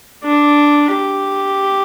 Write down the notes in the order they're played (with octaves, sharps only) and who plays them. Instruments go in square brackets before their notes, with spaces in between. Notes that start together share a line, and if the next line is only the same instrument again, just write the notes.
[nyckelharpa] D4
G4